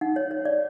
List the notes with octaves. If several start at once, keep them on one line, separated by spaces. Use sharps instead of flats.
D#4 F#5
C#5
C#5
D5